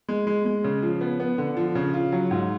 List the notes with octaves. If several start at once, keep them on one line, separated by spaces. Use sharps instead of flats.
G#3
G#3
G#3
C#3
F3
B3
B3
D3
F3
C#3
F4
F#3
G#2